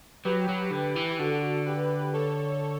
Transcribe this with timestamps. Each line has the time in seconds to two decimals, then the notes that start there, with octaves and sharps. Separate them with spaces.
0.25 F#3 G4 B4
0.49 F#3
0.72 D3
0.96 E3
1.19 D3 F#4 A4
1.66 G4 B4
2.13 A4 C#5